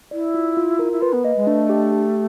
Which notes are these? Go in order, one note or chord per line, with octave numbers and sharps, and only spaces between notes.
E4 D5
F4
F4
A#4
E4
F4 B4
B3
A#3 D#5
G#3
A3 D4
G4
G4